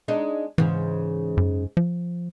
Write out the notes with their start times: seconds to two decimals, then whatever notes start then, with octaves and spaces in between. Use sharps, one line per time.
0.08 G#3 D4 D#4
0.58 G#2 C#3 E3
1.37 F#2
1.77 F3